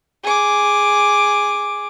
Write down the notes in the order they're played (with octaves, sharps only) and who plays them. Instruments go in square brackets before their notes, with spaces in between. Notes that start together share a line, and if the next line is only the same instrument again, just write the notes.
[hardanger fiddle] G#4 D6